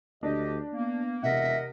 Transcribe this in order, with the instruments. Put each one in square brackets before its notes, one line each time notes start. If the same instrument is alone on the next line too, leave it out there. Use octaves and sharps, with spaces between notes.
[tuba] D2 [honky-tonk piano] D4 [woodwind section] G4 D#5
[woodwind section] A#3 [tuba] B3
[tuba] E1 [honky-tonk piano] C3 [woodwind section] A#4 D#5 F#5 [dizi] E5